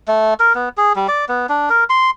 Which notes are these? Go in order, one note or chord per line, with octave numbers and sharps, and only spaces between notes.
A3
A#4
B3
G#4
G3
D5
B3
D4
A#4
C6